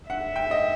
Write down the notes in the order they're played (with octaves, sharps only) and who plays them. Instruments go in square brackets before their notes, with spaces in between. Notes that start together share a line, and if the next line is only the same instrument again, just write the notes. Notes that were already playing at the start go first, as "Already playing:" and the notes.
[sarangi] E5 [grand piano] F#5
[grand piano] G5
D#5